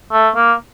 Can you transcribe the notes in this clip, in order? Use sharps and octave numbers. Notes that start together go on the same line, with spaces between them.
A3
A#3